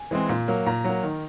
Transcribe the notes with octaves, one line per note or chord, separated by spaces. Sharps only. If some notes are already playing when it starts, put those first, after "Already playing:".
Already playing: G#5
E3 G#3 C4
A#2
F#3 A#3
A#2 A#5
F#3 A#3
D#3